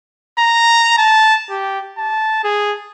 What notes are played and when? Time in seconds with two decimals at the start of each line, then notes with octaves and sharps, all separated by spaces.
0.39 A#5
0.98 A5
1.50 G4
1.98 A5
2.44 G#4